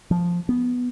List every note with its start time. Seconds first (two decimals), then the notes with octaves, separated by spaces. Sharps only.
0.11 F3
0.49 B3